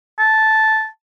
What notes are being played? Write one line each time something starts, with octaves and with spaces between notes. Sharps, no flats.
A5